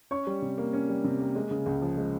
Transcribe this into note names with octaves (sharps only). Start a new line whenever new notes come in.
C#4 C#5 C#6
G3
C3
A#3
C#4
G3
C3
A#3
G#3
C#3
C#2
F3
G#3